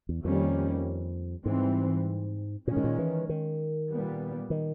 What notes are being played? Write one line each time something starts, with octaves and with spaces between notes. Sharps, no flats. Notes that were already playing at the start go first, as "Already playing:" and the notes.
E2
F2 D#3 G3 A#3 C#4
G#2 E3 G3 C4
A#2 D#3 G#3 C#4
A2
A#2
E3
D#3
A#2 G3 B3
D#3